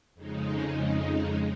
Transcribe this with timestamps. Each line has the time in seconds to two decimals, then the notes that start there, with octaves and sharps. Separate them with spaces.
0.15 F2 C#3 G#3 D#4